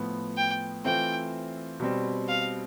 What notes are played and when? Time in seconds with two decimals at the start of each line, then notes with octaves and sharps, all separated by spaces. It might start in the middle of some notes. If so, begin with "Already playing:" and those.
Already playing: A2 F3 B3
0.37 G5
0.85 E3 A3 C4 F4 C5 G5
1.80 B2 G3 C4
2.28 F5